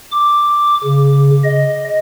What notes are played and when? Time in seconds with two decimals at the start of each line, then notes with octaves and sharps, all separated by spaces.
0.12 D6
0.84 C#3
1.44 D#5